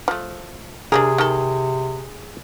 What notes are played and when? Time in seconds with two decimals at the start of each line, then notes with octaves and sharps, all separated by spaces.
0.08 F3 A3
0.92 C3 D4 D#4 G#4 A#4
1.18 D#3 A4